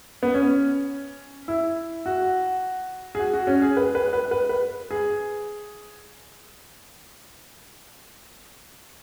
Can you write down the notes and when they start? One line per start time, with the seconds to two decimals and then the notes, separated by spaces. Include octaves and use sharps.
0.23 B3
0.34 C#4
1.48 E4
2.06 F#4
3.15 G#4
3.19 F#4
3.34 F#4
3.47 C#4
3.62 G#4
3.77 B4
3.95 B4
4.13 B4
4.31 B4
4.49 B4
4.91 G#4